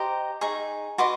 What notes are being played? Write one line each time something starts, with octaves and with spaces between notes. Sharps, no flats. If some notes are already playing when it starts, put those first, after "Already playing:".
Already playing: G4 C5 D#5 A#5 C6
D#4 G#4 C#6
F#4 B4 D#5 C6 D6